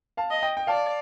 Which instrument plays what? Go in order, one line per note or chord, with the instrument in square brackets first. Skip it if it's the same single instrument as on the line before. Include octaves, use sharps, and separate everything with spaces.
[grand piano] F5 A5
[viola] D#5
[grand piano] D#5 G5
G5
[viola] D5 [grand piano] F5 A5